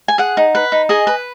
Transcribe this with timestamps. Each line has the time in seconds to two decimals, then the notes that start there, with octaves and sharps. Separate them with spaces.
0.08 G#5
0.18 G#4 F#5
0.37 D#4
0.55 B4
0.72 D#4
0.89 G#4 D#5 G#5
1.07 B4